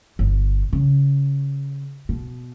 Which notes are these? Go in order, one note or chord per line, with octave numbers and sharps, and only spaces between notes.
G1
C#3
B2